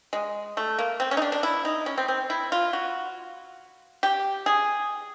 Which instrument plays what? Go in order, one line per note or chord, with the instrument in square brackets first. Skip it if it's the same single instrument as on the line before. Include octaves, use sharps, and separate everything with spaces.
[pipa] G#3
A3
A#3
C4
C#4
D#4
D4
D4
E4
D#4
C#4
C4
C4
E4
F4
F#4
G4
G#4